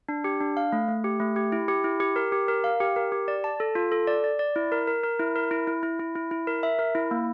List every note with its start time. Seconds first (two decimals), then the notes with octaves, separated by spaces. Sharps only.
0.09 D4
0.24 G4
0.41 D4
0.57 F5
0.72 A3
0.88 A3
1.04 G4
1.20 A3
1.36 G4
1.52 E4
1.68 G4
1.84 E4
2.00 G4
2.16 A#4
2.32 G4
2.48 A#4
2.64 F5
2.80 G4
2.96 A#4
3.12 G4
3.28 D5
3.44 A5
3.60 A4
3.75 F4
3.92 A4
4.07 D5
4.24 D5
4.39 D5
4.56 E4
4.72 A#4
4.87 A#4
5.04 A#4
5.20 E4
5.36 A#4
5.51 E4
5.67 E4
5.83 E4
6.00 E4
6.15 E4
6.31 E4
6.47 A#4
6.63 E5
6.79 A#4
6.95 E4
7.11 A#3